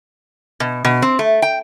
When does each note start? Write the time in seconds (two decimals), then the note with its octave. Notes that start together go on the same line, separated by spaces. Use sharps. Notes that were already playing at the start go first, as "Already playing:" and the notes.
0.60 B2
0.85 B2
1.02 C4
1.19 A3
1.42 G5